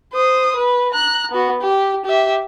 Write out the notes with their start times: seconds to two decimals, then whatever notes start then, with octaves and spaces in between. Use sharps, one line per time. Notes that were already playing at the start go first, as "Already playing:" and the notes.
0.13 C5 D#6
0.56 B4
0.90 A#5 F#6
1.32 B3 F#4
1.62 G4
2.06 G4 E5